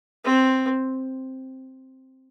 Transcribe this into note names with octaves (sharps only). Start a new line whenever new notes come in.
C4